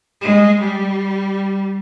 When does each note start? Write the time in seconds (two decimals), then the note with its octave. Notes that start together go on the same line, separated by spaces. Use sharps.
0.21 G#3
0.60 G3